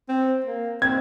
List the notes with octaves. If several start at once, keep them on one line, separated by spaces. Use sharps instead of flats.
C4
A#3
C4 G#6